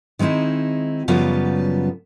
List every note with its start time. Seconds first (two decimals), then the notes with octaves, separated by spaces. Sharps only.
0.19 D#3 G#3 C4 D#4 E4
1.08 F#2 C#3 F3 G3 B3 F4